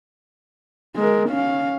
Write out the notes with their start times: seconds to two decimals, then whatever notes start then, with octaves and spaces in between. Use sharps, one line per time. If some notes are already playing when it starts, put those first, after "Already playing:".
0.96 G#3 A#4
1.29 C#4 F5